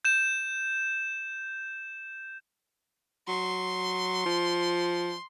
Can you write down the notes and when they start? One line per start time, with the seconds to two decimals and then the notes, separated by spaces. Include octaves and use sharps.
0.05 G6 E7
3.28 F#3 C6
4.26 F3